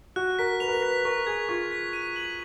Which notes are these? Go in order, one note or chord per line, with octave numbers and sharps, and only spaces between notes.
F#4 F#6
A#4 B6
B4 F7
A#4
B4
B6
A#4 C#6
G#4 G#6
F4 C#6
B6
D#7
F#7